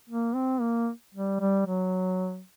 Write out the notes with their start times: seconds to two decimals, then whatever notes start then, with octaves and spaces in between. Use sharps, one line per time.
0.10 A#3
0.35 C4
0.61 A#3
1.15 G3
1.40 G3
1.67 F#3